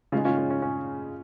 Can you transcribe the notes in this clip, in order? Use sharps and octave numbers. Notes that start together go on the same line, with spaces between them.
C#3 G#3 C#4 D#4 F4
C#4 F4
C#4
C#4
C#4